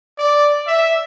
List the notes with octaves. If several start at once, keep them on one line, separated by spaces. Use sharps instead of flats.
D5
E5